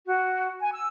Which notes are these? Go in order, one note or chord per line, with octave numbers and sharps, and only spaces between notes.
F#4
G#5
E6